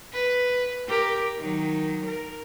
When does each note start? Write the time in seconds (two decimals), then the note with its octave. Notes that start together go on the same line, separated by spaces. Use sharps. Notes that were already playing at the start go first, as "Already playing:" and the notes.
0.13 B4
0.89 G4 A#4
1.39 D#3 F#3
2.06 A#4